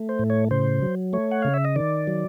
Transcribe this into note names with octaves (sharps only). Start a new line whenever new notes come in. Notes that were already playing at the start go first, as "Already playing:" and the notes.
Already playing: A3
C5
A2
C#5
C#3 C5
F#3
A3 C#5
F#5
C#3 F5
E5
D#5
D#3 D5
F#3